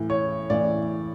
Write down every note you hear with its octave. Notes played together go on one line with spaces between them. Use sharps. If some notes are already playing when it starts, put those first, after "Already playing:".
Already playing: A2 E3
C#5
A2 E3 D5